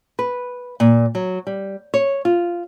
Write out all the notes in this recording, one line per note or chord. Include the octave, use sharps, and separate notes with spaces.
B4
A#2
F#3
G3
C#5
F4